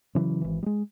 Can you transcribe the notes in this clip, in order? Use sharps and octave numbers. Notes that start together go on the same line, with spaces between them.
C#3 E3 F#3
G#1 E3
G3 G#3